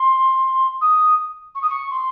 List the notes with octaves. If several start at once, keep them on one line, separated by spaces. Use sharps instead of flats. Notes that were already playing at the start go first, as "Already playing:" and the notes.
Already playing: C6
D#6
C#6
D#6
C#6
C6